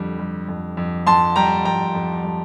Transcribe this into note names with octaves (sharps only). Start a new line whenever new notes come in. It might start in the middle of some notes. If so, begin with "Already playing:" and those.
Already playing: F2 D3 G3
G3
F2
F2
F2 A5 C6
G3 G5 A#5
F2 G5 A#5
F2
G3